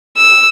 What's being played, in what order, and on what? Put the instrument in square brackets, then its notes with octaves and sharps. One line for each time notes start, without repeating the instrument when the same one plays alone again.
[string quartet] E6